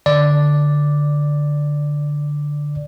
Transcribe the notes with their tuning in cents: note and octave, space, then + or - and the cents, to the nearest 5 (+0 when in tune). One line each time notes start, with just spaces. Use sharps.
D3 +0 D5 +0